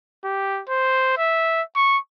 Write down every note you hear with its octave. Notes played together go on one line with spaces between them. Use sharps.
G4
C5
E5
C#6